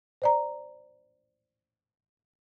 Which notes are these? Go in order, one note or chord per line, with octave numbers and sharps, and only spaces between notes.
C5 D5 A#5